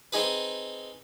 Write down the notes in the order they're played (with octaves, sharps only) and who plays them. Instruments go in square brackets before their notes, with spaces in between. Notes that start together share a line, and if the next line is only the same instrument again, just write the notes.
[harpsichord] C4 D#4 G#4 B4